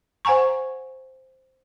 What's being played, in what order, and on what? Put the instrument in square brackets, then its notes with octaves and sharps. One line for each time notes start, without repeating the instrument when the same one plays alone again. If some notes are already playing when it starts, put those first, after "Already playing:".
[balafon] C5 F#5 G#5 A#5 C#6